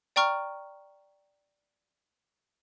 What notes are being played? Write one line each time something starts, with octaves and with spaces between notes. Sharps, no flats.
D5 G5 A#5 C#6 F6